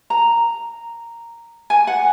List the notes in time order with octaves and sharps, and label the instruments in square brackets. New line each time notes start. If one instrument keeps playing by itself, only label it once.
[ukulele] A#5
G#5
F#5